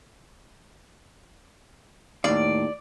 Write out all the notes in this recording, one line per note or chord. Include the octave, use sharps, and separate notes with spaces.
D#2 A2 D5 F5